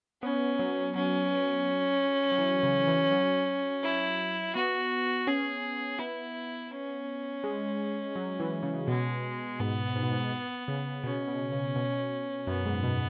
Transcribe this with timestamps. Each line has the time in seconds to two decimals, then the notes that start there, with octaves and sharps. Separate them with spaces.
0.23 B3 C#4
0.59 F#3
0.95 F#3 C#4
2.32 F#3
2.39 E3
2.63 C#3
2.87 E3
3.11 F#3
3.83 E4
4.55 B3 F#4
5.27 C#4 G#4
5.99 B3 E4
6.71 C#4
7.44 G#3
8.16 F#3
8.40 E3
8.63 C#3
8.88 B2 G#3
9.60 G#2 B3
9.96 G#2
10.03 B2
10.11 G#2
10.68 C#3
11.04 B2 C#4
11.28 B2
11.52 C#3
11.76 B2
12.47 F#2 B3
12.66 G#2
12.84 B2